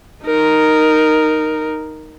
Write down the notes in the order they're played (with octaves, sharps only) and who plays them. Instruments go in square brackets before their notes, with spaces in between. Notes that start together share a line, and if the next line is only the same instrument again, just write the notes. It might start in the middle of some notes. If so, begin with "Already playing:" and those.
[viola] D#4 A#4